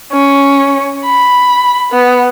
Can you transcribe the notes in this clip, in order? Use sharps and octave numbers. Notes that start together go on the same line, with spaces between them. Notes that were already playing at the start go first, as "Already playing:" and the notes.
C#4
B5
B3